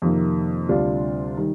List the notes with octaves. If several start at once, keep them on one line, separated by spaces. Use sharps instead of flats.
F2 C3 D#3 A#3
D2 C3 G3 D4 F4
D#3 G3